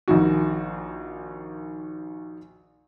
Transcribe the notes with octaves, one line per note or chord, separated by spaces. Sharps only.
A#1 D#3 F#4